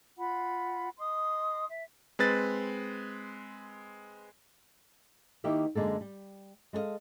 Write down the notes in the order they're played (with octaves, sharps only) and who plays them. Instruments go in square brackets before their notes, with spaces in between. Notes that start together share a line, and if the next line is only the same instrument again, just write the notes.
[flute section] F4 F#5 B5
D#5 C6 D#6
E5
[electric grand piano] G#3 C4 B4 A6
[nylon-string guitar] D#3 A#3 E4 G4 E5
F#2 D3 G#3 A#3 A4
G3
G#3 A4 C5 D#5 F5